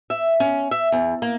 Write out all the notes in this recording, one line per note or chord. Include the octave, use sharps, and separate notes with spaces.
E5
C#4
E5
E2
A#3